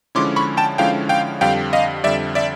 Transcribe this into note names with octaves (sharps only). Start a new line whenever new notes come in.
D3 F3 G#3 C#4 E4 C6 D6
B5 C#6
G5 A5
D3 F3 G#3 C#4 E4 F5 G5
F5 G5
F2 D3 G3 F5 G5
D#5 F5
F2 D3 G3 D5 E5
D5 E5